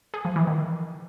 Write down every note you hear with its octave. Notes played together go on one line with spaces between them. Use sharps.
G#4
F3
E3
D#3